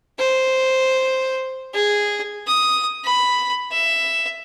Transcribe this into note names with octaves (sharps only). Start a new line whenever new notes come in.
C5
G#4
D#6
B5
E5